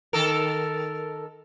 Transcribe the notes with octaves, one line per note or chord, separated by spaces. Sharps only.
D#3 A4 A#4